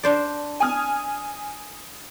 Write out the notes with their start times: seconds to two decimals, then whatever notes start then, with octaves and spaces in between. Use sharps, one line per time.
0.03 D4 C5 D5
0.60 G#5 D#6 F6